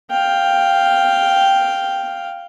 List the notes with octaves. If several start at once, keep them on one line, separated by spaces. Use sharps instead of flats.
F5 G5